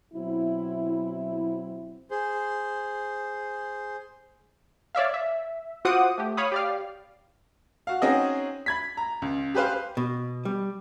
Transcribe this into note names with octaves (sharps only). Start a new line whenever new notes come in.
B2 F#3 C4 E4
G#4 C5
C#5 D5 E5 F5
E5
F4 F#4 C5 F#5 D6 D#6
A3 G4
C#5 F5 B5 D#6
G4 D5 F5
F#4 F5
C4 C#4 D#4 F#4 G#4 D#5
B5 G#6 B6
A#5
C#2
G4 G#4 B4 C5 F5
B2
G3